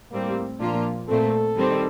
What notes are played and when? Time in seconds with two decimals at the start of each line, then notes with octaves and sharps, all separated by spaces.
0.11 A2 G3 A#3 C4
0.60 A#2 F3 A#3 D4 F4
1.09 A#2 A3 C4 A4
1.57 D#3 G3 C4